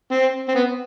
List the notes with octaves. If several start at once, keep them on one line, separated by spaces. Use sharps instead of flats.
C4
C4
B3